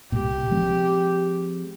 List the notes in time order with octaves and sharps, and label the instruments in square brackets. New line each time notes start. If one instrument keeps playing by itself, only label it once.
[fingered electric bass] C2 A#2 [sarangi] G4
[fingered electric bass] F3 G#3 C4